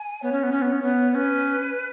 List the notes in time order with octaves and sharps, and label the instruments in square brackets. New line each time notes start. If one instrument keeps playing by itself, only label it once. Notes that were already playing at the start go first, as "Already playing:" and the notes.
Already playing: [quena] G#5
[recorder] B3 [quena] C#5
[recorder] C#4
B3
C#4
B3
C#4
B3
[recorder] C#4 [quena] B4